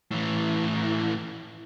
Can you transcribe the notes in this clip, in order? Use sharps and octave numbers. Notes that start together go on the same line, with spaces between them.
A2 E3